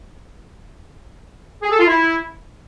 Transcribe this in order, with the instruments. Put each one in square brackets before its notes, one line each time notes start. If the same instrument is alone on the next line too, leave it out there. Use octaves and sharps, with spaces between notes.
[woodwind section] G#4
A4
F4
E4